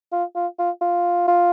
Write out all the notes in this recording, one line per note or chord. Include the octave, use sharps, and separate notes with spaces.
F4
F4
F4
F4
F4